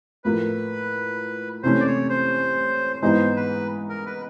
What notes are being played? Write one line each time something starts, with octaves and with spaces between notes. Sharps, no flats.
A2 F3 A#3 B4
C3 E3 A3 C#4 C5
D5
C#5
C5
G#2 E3 G#3 B3 D#4 C5
B4
A#4
B4